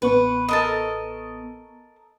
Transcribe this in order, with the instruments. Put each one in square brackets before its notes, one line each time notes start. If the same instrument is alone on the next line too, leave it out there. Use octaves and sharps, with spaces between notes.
[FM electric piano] A1 B3 C#6 [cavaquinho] B4
[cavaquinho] A4 A#4 D#5